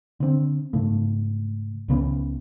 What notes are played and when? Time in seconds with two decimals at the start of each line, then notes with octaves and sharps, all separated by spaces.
0.20 D3 C4
0.73 G#2 C#3 A3
1.88 C#2 C#3 B3 C#4